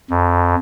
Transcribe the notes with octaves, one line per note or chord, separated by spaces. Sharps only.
F2